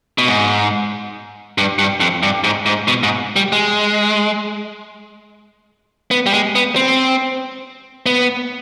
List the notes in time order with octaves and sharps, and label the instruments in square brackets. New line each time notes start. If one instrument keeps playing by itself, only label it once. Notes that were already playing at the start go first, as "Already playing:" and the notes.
[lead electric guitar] B2
G#2
G2
G2
F2
G2
G#2
G#2
B2
G#2
G3
G#3
B3
G3
G#3
B3
C4
B3